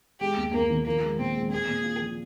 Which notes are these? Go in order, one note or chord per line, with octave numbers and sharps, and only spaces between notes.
G#3 G4
D#2
D#2 A#3
D#3
F3 A#3
G#3
A#2 C4
G#3
C4 G#4
A#2
F4
F3